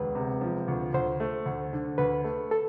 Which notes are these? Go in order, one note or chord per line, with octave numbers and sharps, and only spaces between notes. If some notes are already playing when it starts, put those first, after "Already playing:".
Already playing: E1 D2 B4
C3
F3
D2
D2 C5
A3
D2
D3
D2 B4
A3
A4